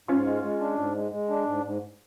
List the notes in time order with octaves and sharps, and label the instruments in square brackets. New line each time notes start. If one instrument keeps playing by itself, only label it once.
[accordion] G#2 [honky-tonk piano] C#4 F4
[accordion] G#3
G#3
D4
G#2
G#3
G#3
D4
G#2
G#2